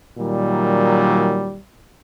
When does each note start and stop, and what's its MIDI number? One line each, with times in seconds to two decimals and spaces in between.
0.18 1.57 46
0.18 1.57 51
0.18 1.57 54
0.18 1.57 55